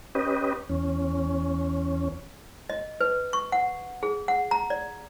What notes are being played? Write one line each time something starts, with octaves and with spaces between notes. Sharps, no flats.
C#4 G4 B4 D#5
E2 C#4
D#5
B4
C#6
F#5
G#4
F#5
A#5
D5